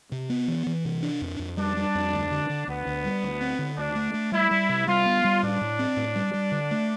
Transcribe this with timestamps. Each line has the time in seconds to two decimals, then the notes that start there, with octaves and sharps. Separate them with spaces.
0.12 C3
0.30 B3
0.48 E3
0.67 E3
0.85 C3
1.02 D4
1.22 F2
1.39 F2
1.57 G3 D4
1.77 G3
1.95 F2
2.13 D2
2.31 D3
2.50 D3
2.68 D2 B3
2.87 D2
3.05 G3
3.23 D2
3.41 C4
3.59 D3
3.77 D2 D4
3.95 A3
4.14 A3
4.32 G3 E4
4.51 G3
4.69 C3
4.88 G3 F4
5.06 B3
5.24 G3
5.43 A2 D4
5.61 A2
5.79 C4
5.97 A2
6.15 G3
6.34 G3
6.52 D3
6.71 A3